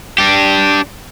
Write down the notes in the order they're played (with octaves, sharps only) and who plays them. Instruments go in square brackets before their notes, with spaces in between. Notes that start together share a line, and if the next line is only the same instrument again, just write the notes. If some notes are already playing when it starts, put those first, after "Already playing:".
[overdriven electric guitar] D4 G4